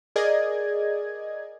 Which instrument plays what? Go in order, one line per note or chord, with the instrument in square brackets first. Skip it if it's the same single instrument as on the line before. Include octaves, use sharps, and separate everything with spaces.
[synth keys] G#4 A#4 D5 D#5 G#6